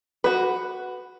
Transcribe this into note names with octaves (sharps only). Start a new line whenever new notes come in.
F#4 B4